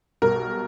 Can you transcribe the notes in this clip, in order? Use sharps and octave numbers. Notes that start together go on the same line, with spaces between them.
B1 B2 G3 A#4